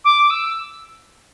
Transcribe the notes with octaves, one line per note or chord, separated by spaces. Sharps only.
D6
E6